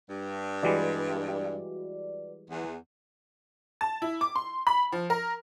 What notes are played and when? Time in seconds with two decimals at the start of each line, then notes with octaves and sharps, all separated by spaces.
0.08 G2
0.63 E3 G3 G#3 F#4 B4 D5
2.50 E2
3.81 A5
4.02 E4
4.21 D6
4.36 C6
4.67 B5
4.92 F3
5.10 A#4